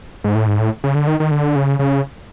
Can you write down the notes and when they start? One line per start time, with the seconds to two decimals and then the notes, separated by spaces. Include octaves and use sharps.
0.24 G#2
0.35 A2
0.47 G#2
0.59 A2
0.84 C#3
0.95 D3
1.07 D#3
1.20 D#3
1.31 D3
1.56 C#3
1.79 C#3